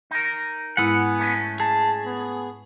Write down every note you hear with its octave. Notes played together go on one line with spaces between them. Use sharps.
D#4 A#4
G#2 G#3 B3 E4 F#5 G#5
A3 C#4
G#4 A5
B3